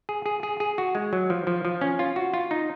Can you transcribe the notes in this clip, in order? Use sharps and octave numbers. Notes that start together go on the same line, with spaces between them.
G#4
G#4
G#4
G#4
F#4
G#3
F#3
F3
F3
F3
C#4
F4
F#4
F4
D#4